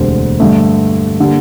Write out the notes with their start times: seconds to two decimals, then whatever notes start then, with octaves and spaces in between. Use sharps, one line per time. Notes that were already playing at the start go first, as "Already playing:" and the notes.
Already playing: E1 D2 D3 G3 C4
0.40 G2 D3 A3
1.20 D3 G3 A#3